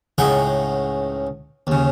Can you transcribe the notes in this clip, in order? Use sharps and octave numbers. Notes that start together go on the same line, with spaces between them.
C#2 A2 D#4 G#4 F#5 G5
D#2 C#3